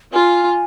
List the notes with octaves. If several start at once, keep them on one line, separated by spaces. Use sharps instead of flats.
F4 G#5